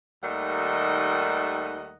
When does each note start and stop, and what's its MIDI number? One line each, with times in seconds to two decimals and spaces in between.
0.22 1.96 39
0.22 1.96 51
0.22 1.96 55
0.22 1.96 57
0.22 1.96 75
0.22 1.96 78